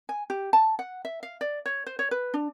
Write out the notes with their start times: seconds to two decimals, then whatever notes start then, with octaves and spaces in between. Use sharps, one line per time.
0.09 G#5
0.30 G4
0.53 A5
0.79 F#5
1.05 E5
1.23 F5
1.41 D5
1.66 C#5
1.86 C5
1.99 C#5
2.11 B4
2.34 D4